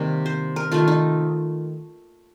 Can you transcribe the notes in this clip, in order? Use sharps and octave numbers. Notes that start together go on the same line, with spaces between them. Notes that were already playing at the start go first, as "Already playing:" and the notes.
Already playing: C3 D#3 G3 A#3
C5
A#4
D#3 A3 F4
D#4